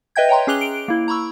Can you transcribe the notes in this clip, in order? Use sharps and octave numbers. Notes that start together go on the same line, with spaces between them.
B4 D#5 E5 G5 G6 G#6
C#5 G5 A#5 C6
C#4 G#4 D6 F#6 F7 G7
D7
A#3 E4
A#5 B5 C#6 E6